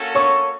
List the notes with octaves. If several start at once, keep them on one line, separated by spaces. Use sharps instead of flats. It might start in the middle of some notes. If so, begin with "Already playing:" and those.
Already playing: A#3 C#4 F#4 A4
C#5 C#6